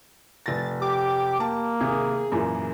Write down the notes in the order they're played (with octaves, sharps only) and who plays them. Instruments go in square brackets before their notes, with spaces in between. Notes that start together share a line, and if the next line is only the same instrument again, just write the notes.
[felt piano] F1 A#6 [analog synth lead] A6
[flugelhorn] G4 [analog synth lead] D6
[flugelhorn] A#3 [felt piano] A5
[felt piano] D#2 C3 [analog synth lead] G#4
[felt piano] F#2 A#2 E3